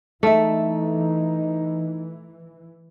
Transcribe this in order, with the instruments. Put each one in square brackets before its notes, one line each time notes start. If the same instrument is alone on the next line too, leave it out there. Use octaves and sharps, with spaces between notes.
[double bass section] E3 [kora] A3 [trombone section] D#4 [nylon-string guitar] A4 E5